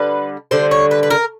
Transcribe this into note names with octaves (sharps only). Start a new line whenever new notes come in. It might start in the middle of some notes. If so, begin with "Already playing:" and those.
Already playing: D3 G3 B4
D3 G3 C5
C#5
B4
B4
A#4